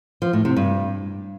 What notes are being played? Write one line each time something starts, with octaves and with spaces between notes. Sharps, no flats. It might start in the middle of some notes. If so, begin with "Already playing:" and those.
F3
A2
C3
G2